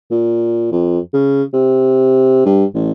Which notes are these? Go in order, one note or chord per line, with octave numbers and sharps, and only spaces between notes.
A#2
F2
C#3
C3
G2
A1